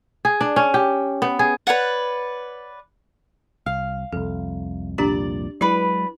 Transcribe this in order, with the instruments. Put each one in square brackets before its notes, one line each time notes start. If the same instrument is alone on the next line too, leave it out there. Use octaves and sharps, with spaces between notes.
[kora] G#4
D4
C#4
G4
B3
G#4
[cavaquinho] B4 C#5 D5 F#5
[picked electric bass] C2 [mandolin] F5
[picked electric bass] C2 F2 [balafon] A4
[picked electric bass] C2 F2 A#2 [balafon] D4 G4 A#5 [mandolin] D5
[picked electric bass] F#3 G#3 [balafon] E4 [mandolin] B4 D5